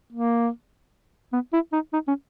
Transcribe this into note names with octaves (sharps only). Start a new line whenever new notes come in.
A#3
B3
E4
D#4
D#4
C#4